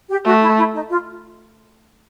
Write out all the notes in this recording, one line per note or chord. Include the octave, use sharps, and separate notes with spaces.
G4
A3 F#4
E4
E4
D#4
F4